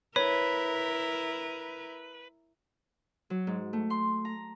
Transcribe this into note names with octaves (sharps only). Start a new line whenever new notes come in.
E4 A#4 B4 C#5
F#3
G#2
A3
C6
A#5